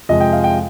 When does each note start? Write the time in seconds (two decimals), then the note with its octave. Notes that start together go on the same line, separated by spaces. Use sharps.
0.09 F2 C3 F3 G#3 D#5
0.21 G5
0.32 F5
0.44 G5